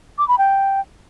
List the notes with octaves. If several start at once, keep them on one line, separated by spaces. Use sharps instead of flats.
D6
B5
G5